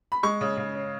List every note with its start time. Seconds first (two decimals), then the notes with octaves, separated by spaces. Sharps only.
0.12 B5
0.23 G#3 C#6
0.41 C#3
0.57 C#3
0.75 C#4